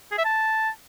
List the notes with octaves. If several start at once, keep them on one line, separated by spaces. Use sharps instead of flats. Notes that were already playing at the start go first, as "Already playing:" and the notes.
G#4
E5
A5